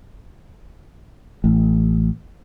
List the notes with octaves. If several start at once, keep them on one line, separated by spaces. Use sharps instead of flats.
A1